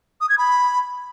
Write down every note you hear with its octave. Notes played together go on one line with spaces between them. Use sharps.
D#6
G#6
B5